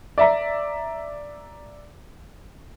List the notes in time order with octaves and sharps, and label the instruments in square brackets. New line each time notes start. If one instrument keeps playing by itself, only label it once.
[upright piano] D5 E5 A#5